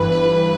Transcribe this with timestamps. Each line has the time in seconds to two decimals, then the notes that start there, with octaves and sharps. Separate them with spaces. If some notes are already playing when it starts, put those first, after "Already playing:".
Already playing: G1 G2 E3 B4
0.12 B4